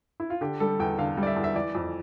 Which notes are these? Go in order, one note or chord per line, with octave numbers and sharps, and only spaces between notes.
E4
F4
D3 G4
G3 A4
E2 G5
D3 F5
G3
D5
E5
E2
E5
E3 D5
F2